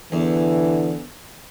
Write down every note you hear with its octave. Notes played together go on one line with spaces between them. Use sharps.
E2 D3 E3